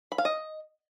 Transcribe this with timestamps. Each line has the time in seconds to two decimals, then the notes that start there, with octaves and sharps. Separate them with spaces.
0.12 B5
0.18 F5
0.25 D#5